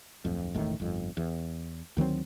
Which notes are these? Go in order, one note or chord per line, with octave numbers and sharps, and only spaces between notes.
D1 F2
E1 A1 A2 D#3
G1 F2
E2
D2 D#3 F#3 C4